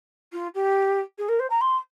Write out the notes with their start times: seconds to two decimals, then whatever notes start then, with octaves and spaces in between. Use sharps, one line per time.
0.33 F4
0.55 G4
1.18 G#4
1.29 A#4
1.39 C5
1.50 A#5
1.61 C6